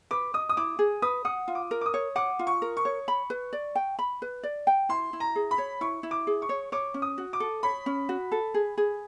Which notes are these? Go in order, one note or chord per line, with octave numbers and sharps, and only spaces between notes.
B4 D6
D#5 D#6
D#6
E4 D6
G#4
B4 D#6
F#5 D#6
F4
D6
A#4
D6
D#6
C#5
F#5 D6
F4
C#6
A#4
C#6
C#5
B5
B4
D5
G5
B5
B4
D5
G5
E4 C6
E4
A#5
G#4
B5
C#5
E4 C#6
E4
D6
G#4
C#6
C#5
C#5 D6
C#4
D#6
F#4
D6
A4
C#5 B5
C#4
F#4
A4
G#4
G#4